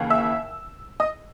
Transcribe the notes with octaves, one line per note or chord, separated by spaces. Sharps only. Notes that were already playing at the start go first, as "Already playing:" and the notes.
Already playing: D#2 C#3 E3
E5 E6
D#5 D#6